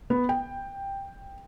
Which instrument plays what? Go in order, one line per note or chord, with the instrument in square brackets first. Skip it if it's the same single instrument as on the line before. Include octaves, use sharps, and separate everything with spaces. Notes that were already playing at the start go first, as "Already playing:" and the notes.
[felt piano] B3
G5